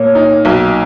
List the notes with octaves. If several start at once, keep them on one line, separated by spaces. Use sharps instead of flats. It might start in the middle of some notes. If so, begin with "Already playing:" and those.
Already playing: A#2 C#5
D#4
B1